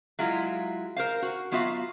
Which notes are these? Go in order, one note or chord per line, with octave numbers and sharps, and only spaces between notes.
F#3 G#3 E4 F4
A#4 C5 F5
F#4
F#3 B3 F4 F#4 E5 F5